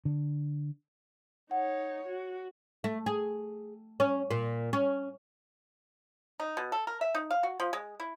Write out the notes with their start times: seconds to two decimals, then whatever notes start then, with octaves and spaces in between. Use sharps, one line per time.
0.05 D3
1.51 D#4 C#5 F#5
2.07 F#4
2.84 A3
3.06 G#4
4.00 C#4
4.31 A#2
4.73 C#4
6.40 D#4
6.57 B2
6.72 A4
6.87 A#4
7.01 E5
7.15 D#4
7.31 F5
7.43 F#4
7.60 F3
7.73 G#3
8.00 E4